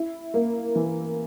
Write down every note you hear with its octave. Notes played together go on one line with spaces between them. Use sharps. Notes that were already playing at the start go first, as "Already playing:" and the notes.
Already playing: E4
A#3
E3